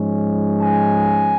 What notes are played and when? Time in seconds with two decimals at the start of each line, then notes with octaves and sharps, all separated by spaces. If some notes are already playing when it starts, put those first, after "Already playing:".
Already playing: G#2 F3 G#3 C#4
0.62 G#5